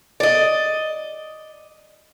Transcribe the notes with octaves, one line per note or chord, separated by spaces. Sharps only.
D5 D#5